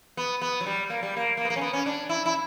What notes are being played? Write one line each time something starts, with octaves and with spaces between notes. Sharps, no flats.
B3
B3
F#3
G3
A#3
G3
A#3
A#3
B3
A#3
C#4
B3
C#4
D4
E4
E4